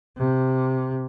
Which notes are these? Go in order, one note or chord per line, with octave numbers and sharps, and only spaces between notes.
C3